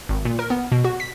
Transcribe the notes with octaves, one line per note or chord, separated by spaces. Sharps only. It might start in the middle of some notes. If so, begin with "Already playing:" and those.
G#1
A#2
A#4
B3
B2
F#4
B6